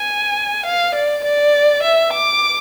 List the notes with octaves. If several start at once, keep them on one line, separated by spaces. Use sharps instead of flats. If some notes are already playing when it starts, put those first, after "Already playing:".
Already playing: G#5
F5
D5
D5
E5
D6